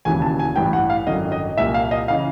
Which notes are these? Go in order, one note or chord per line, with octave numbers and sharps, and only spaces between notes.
E1 D#2 C#3 E3 G#5
A5
G#5
A1 G2 E3 G5
F#5
F5
G#1 F#2 D3 D#5
D#5
C2 A#2 E5
F5
D#5
C#3 E3 F5